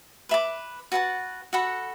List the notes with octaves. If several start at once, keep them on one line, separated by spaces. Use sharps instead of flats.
B4 E5 B5 D6
F#4 B4 F#5 A5
F#4 A4 F#5 B5